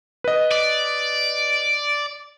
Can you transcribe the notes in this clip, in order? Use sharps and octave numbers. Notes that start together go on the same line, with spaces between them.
B4 D#5
D5